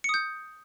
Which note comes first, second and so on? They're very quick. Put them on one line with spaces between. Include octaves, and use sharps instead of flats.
C#7 D#6 G6